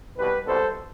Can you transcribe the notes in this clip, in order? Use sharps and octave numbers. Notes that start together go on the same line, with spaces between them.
C2 B2 G3 G4 B4
C2 B2 G3 A4 C5